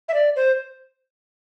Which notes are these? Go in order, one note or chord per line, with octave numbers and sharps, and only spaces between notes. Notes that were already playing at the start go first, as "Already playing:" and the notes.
E5
D5
C5